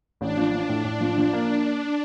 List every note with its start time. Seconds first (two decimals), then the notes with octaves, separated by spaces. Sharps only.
0.20 A1 D4
0.37 F3
0.53 F3
0.69 A2 D4
0.84 A2
1.01 F3
1.18 F3 D4
1.33 A#3